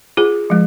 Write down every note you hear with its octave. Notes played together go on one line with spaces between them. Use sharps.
F4 G#4
F3 G#3